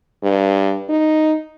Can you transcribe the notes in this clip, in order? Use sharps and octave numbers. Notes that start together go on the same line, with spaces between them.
G2
D#4